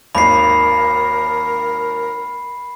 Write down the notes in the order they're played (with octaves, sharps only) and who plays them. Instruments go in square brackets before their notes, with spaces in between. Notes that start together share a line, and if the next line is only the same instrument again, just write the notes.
[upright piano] G#1 D#2 [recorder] A#4 [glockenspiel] B5 C7